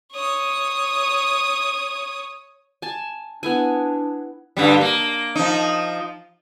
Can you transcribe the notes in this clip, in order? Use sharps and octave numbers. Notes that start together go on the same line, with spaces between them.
C#5 D#6
G#5 A5
B3 D4 E4 G#5
G2 D3 G3
A#3
F3 D#4